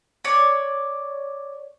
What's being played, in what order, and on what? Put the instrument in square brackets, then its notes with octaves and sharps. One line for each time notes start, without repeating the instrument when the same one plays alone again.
[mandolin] C#5 D5